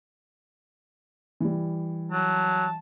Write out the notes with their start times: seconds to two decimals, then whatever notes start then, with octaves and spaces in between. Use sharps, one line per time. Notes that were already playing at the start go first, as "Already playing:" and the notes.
1.40 E3 G3
2.12 F#3 A5